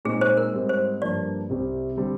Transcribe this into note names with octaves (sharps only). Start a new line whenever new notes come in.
A#2 G#3 C4 D#4 G#4
C5
A#4
G#2 G3 C4
C5
G2 F3 A#3 D4 D5
C2 C3 G3 C4
D3 G3 C4